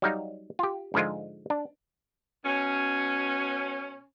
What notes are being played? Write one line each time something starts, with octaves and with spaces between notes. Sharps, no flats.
F#3 G3 D#4 F5
F4 G4
G#2 D3 F3 G#3 F4
D4
B2 C#4